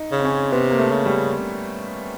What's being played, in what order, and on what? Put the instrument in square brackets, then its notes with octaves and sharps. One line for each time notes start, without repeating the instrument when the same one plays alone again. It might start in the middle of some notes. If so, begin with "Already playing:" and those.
Already playing: [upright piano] D#4
[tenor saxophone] C#3
[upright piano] C4
C#4
[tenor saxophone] C3 [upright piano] B3
[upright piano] A#3
A3
[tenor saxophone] C#3
[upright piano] G3